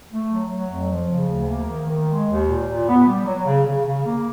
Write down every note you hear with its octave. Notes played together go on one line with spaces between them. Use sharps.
A3
F#3
F#3
F2
F3
C#3
D2
A#3
D#3
D#3
G#3
D#2
A#2
A#2
B3
G3
F#3
C#3
C#3
C#3
A#3